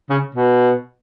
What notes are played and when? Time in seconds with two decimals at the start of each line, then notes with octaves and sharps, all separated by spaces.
0.10 C#3
0.34 B2